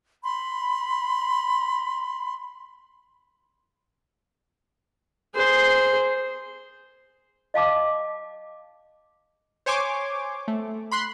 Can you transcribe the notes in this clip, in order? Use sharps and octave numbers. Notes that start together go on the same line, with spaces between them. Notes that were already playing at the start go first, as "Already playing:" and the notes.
B5 C6
G#4 C5
D#5 F5 A5 D6
C5 C#5 G#5 C6 D6
A3
B5 C6 F#6